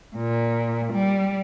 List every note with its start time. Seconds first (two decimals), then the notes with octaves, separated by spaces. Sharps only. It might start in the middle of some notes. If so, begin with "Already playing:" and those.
0.15 A#2
0.92 G3